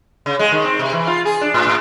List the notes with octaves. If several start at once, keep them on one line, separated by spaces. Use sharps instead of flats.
C#3
G#3
D#3
C4
C3
E3
F4
G#4
D4
A2
A2